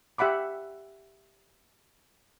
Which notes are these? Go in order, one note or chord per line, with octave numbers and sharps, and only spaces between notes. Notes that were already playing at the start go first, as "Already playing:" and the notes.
G4 E5 F#5 B5 D6